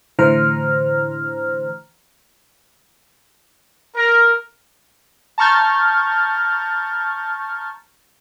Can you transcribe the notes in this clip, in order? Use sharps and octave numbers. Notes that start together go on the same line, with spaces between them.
A2 D3 E3 C5 A#5 F6
A#4
A5 A#5 C#6 F6 G6 A6